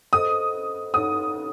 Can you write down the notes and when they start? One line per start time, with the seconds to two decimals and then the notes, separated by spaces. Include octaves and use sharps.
0.13 A4 C5 D#5 D#6
0.94 D#4 A4 C#5 F#5 D#6